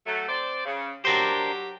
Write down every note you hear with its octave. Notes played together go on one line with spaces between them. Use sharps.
F#3 A3
C4 C5 D5
C#3
F#3 D4 G4 A#4 C5